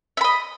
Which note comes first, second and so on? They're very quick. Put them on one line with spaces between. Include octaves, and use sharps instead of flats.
E5 B5 D#5